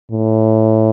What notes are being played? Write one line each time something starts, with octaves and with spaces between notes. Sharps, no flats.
A2